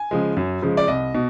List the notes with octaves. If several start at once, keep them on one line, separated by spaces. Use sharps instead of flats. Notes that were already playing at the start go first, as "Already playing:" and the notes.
Already playing: G#5
C#3 F3 G#3
F#2
C#3 F3 G#3
D5
C2 D#5
B2